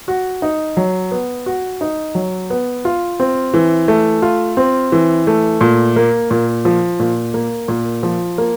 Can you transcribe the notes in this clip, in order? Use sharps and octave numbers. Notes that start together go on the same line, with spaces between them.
F#4
D#4
F#3
B3
F#4
D#4
F#3
B3
F4
C4
E3
A3
F4
C4
E3
A3
A#2
A#3
A#2
F3
A#2
A#3
A#2
F3
A#3